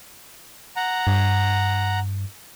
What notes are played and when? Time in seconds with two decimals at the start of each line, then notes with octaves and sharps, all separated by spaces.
0.76 F#5 A#5
1.07 G2